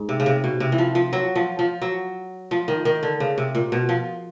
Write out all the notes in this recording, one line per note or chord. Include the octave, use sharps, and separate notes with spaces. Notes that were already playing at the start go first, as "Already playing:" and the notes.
Already playing: G#2
C3
C#3
C3
B2
C3
E3
F3
F3
F#3
F3
F3
F#3
F3
D#3
D#3
D3
C#3
C3
A#2
B2
F3